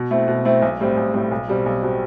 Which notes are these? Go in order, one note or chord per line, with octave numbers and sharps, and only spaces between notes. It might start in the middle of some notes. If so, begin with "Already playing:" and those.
Already playing: B2
A3 C4 E4
B2
A3 C4 E4
B1
A2 G3 C4
B1
A2 G3 C4
B1
B2 G3 C4
B1
B2 G3 C4